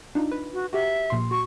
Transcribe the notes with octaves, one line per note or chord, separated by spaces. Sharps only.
D4 D#4 F4
B4
F#4
F#4 G4 E5
A#1 A#2 C6
F#4 C#6